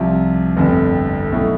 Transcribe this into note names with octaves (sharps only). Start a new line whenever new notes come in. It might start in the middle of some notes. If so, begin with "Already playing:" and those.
Already playing: C2 C3 F3 C4
G1 F2 D3 A3
B1 B2 A3 E4